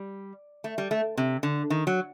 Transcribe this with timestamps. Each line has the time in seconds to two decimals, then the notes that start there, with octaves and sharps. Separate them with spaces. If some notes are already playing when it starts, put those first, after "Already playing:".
Already playing: G3
0.64 A3
0.78 G3
0.91 A3
1.17 C3
1.43 D3
1.70 D#3
1.87 F#3